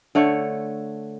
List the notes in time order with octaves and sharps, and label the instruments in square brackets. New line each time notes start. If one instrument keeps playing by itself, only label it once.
[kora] D3 A3 C#5